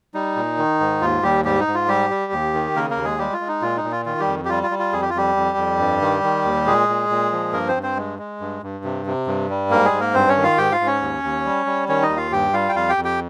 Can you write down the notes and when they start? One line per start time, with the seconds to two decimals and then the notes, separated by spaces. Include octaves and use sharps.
0.14 G3 D#4
0.36 A#2
0.58 D#3
0.80 G#2
1.01 D#2 F4
1.23 D#2 G3 G4
1.45 G#2 G3 G4
1.60 D#4
1.67 G#2
1.74 F4
1.88 G3 G4
2.10 G3
2.33 D#2
2.53 D#3
2.76 C#3 A#3 A#4
2.90 A#3 A#4
2.97 D#2
3.04 G#3 G#4
3.18 G3 G#3 G4
3.33 F4
3.40 G#3
3.48 D#4
3.62 A#2 F4
3.77 D#4
3.84 A#2
3.91 F4
4.06 D#3 F4
4.20 G3 G4
4.27 F2
4.45 G4
4.49 G3 F4
4.63 F4
4.71 G3
4.79 F4
4.93 F2 G#4
5.02 G4
5.10 F4
5.14 F2 G3 G4
5.36 F2
5.57 F2
5.79 G2
6.01 D#3
6.23 D#3
6.45 D#2
6.66 A#2 G#3 G#4
6.89 A#2
7.10 A#2
7.32 F3
7.53 G2 A#3 A#4
7.68 C4 C5
7.75 G2
7.83 C4 C5
7.97 G#3
8.19 G#3
8.41 G2
8.62 G2
8.85 C3
9.06 C3
9.27 G2
9.50 G3
9.70 G#2 A#3 A#4
9.85 G#3 G#4
9.92 G#2
10.00 A#3 A#4
10.14 G2 C4 C5
10.29 C#4 C#5
10.37 D#3
10.43 F4 F5
10.58 G#2 G4 G5
10.72 F4 F5
10.80 G#2
10.86 C#4 C#5
11.02 D#2
11.24 D#2
11.45 G3
11.66 G3
11.89 D#3 C#4 C#5
12.02 D#4 D#5
12.09 D#2
12.17 F4 F5
12.32 G2 G4 G5
12.53 G3 F4 F5
12.69 G5
12.75 F2 F4 F5
12.89 G4 G5
12.97 F2
13.04 G4 G5